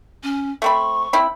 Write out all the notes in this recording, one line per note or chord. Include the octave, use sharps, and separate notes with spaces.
C#4
A3 C4 B5 C#6
C4 E4 B5